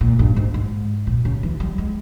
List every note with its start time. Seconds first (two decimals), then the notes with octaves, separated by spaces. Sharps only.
0.01 A#2
0.19 G2
0.36 G#2
0.54 G#2
1.07 A#2
1.25 C#3
1.43 E3
1.60 G3
1.78 G#3